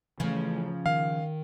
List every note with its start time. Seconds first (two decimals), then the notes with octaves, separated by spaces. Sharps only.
0.20 C#3 E3 F3 A3
0.86 D#3 F5